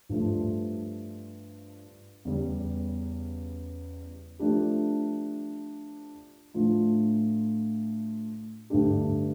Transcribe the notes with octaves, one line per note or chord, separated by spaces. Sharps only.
G2 F3 A3
E2 C#3 G3 C#4
F3 A3 D4 G4
A2 F3 A3 D4 F4
G2 D3 A3 D4 G4